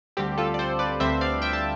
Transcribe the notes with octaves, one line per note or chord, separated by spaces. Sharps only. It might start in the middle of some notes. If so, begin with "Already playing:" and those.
D2 D3 G3 C4 G4
F4 A4
D5
A4 C5
B4 D5
D2 D3 G3 C4 C5 E5
D5 F5
E5 G5
A5